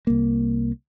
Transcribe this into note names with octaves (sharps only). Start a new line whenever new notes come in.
C2 A#3